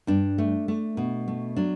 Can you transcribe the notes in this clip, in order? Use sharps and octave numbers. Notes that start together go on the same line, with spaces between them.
G2 D4
A3
A3
B2
A3
F#3 D4